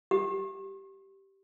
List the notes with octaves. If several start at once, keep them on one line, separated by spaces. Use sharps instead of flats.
G4